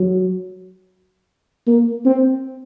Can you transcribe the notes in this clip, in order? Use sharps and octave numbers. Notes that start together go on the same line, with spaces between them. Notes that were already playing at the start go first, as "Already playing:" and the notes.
Already playing: F#3
A#3
C4